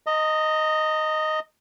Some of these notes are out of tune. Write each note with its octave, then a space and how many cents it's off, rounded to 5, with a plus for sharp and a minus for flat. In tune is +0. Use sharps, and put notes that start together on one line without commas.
D#5 +0 A#5 -35